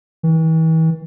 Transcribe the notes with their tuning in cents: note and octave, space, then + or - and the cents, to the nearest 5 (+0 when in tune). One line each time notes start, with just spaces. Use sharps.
E3 -40